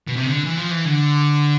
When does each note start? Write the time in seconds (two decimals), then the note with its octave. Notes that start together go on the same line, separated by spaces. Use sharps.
0.08 B2
0.17 C3
0.27 D3
0.45 E3
0.58 F3
0.71 E3
0.85 D3